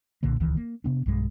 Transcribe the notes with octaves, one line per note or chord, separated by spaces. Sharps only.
B1 A#2 D3 A#3
D#1 C#2 D#3 E3
A#3
C3 B3 D4
B1 G2 F#3 G#3